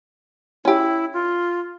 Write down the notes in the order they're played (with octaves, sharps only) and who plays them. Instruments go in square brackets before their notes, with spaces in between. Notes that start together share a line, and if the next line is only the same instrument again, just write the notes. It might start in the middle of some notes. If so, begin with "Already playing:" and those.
[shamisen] C#4 G4 [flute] E4
[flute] F4